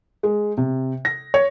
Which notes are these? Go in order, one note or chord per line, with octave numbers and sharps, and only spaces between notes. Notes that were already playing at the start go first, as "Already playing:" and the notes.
G#3
C3
A#6
C#5